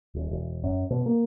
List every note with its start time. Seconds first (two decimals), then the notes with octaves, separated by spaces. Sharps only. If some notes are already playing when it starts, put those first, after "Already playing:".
0.15 D#1
0.31 E1
0.64 F#2
0.90 B2
1.06 A#3